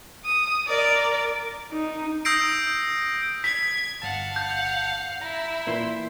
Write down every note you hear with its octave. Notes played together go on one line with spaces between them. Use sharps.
D#6
A#4 D5
D#4
D#6 E6 G6 A#6 C7 D7
G#6 B6
G1 F5 F#5 A5
G6
E4 A#5
A#2 E3 C6